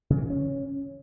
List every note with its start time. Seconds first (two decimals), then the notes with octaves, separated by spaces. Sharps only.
0.10 C#3
0.17 E3
0.23 C#3
0.30 C#4